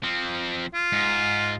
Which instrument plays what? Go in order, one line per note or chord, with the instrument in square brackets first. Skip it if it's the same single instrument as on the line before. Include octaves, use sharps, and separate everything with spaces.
[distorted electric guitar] F3 C4
[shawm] F4
[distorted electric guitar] G#2